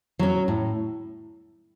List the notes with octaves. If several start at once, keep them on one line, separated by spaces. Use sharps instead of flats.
F#3 C#4
A2